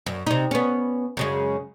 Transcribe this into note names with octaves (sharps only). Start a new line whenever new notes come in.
F#2
C3 D#4
B3 C#4
F#2 C#3 G#3